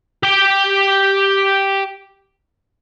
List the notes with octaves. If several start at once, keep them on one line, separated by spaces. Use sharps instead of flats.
G4 G5